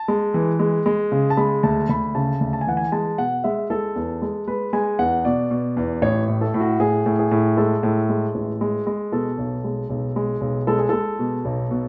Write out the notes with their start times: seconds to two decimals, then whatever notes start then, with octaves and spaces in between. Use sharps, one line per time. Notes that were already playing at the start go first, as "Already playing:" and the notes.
Already playing: A5
0.08 G#3
0.34 E3
0.59 G#3
0.86 G#3
1.12 C#3
1.30 A5
1.37 G#3 B5
1.63 D2 A5
1.89 D2 B5
2.15 C#3 A5
2.41 D2
2.53 A5
2.61 G#5
2.67 E3 F#5
2.77 G#5
2.92 G#3 A5
3.18 B2 F#5
3.44 G#3 E5
3.70 G#3 A4
3.96 E2
4.22 G#3
4.47 G#3 B4
4.73 G#3 G#5
4.99 E2 F#5
5.25 B2 D5
5.51 B2
5.77 E2
6.02 A1 C#5
6.28 A2
6.41 A4
6.54 A2
6.60 F#4
6.80 A2 G#4
7.06 A2
7.19 G#4
7.31 A2
7.57 G#3 A4
7.83 A2
8.09 G#3
8.35 A1
8.61 G#3
8.87 G#3
9.12 B2 A4
9.38 B1
9.64 G#3
9.90 B1
10.16 G#3
10.41 B1
10.67 G#3 A4
10.78 G#4
10.89 G#3 A4
11.19 B2
11.45 B1
11.71 B2